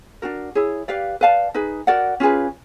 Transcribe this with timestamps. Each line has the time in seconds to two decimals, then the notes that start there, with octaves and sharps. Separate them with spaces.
0.22 D4 F#4 A#4
0.55 E4 G#4 C#5
0.88 G4 B4 D5 F5
1.21 B4 D5 F5 A5
1.54 D#4 G#4 B4
1.87 F#4 A#4 D5 F#5
2.20 C#4 F4 G#4 B4